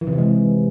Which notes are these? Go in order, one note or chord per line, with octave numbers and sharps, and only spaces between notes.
E3
C3
E3
G#3